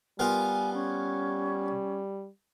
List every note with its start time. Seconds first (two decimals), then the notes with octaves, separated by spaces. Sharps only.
0.19 G3 B3 F4 A#4 G#5
0.73 C#4